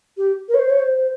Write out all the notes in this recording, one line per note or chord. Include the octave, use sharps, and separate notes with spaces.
G4
A#4
C#5
C5
C#5
C5